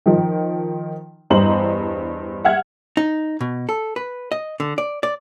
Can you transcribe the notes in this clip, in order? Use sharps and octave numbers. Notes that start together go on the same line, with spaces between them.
D#3 F3 D#4
E2 G2 C5 D#5 A#5 F#7
E5 F#5 F6 G#6
D#4
B2
A4
B4
D#5
D3
D5
D5